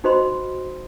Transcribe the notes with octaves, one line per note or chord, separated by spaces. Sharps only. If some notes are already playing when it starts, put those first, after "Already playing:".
D#4 F#4 C5 D#5 B5 C6